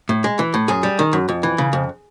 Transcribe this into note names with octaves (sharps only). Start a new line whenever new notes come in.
A2
G#3
E3
A2
F#2 G#4
G3
D#3
F#2
F2
E3
C#3
F2